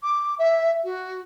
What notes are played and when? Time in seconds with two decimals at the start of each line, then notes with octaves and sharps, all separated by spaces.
0.03 D6
0.38 E5
0.84 F#4